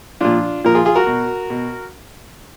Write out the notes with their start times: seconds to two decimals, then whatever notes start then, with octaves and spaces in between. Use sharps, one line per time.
0.20 A#2 F3 D4 F4
0.64 A#2 F3 A#4
0.75 F4 G#4
0.85 F4 G#4
0.95 F#4 A#4
1.07 B2
1.50 B2